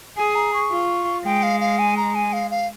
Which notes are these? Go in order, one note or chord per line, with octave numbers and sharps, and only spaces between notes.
G#4 G#5
A#5
C#6
F4
G#3 G5
F5
F5
G#5
A#5
G#5
F5
F5